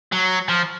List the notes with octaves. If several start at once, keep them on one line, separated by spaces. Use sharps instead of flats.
F#3
F3